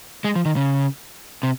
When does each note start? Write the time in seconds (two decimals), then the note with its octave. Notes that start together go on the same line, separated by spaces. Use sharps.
0.24 G#3
0.36 F3
0.45 D#3
0.56 C#3
1.43 C3